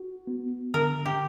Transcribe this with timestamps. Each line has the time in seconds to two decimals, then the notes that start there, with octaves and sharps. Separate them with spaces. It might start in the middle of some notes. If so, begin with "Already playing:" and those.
Already playing: F#4
0.27 B3
0.74 D3 A#4
1.06 G4